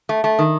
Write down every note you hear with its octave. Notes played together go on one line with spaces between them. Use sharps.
A3
A3
D#3